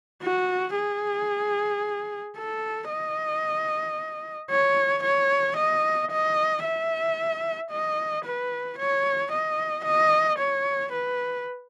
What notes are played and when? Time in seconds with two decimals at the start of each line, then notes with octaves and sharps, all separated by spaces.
0.22 F#4
0.75 G#4
2.37 A4
2.90 D#5
4.50 C#5
5.03 C#5
5.57 D#5
6.11 D#5
6.64 E5
7.71 D#5
8.25 B4
8.79 C#5
9.32 D#5
9.85 D#5
10.39 C#5
10.92 B4